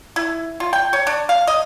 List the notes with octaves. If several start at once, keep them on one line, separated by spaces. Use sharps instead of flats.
E4
F4
G5
C#5
D4
F5
D#5